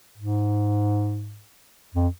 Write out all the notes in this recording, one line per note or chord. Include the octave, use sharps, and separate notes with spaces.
G#2
F2